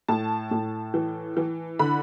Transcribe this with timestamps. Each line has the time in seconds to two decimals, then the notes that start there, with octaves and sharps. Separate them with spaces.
0.08 A2 A5
0.51 A2
0.94 E3
1.37 E3
1.79 D3 B5